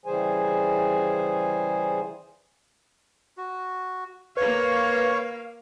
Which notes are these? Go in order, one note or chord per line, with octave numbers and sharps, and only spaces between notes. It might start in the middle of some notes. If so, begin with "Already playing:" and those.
C#3 E3 G3 G#4 C5 G#5
F#4
A#3 B4 C#5 F5 C#6